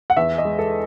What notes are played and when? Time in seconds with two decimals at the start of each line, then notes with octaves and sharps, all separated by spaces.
0.10 F#5
0.17 E2 E5
0.38 D#5
0.45 G#3
0.59 A4